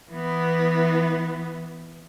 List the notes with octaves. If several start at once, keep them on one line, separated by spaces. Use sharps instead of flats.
E3 B3